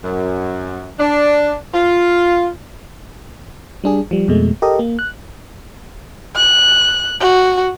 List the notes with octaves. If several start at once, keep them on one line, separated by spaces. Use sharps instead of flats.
F#2
D4
F4
G3 D4 G#4
F3 G3
F2 B2 G#3 A3
G4 A4 A#4 D#5
A#3
F#6
F#6
F#4